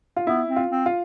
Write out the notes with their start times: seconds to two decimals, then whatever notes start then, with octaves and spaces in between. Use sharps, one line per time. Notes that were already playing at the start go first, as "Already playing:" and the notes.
0.16 F4
0.27 B3 E4
0.49 C4
0.56 F4
0.71 C4
0.86 F4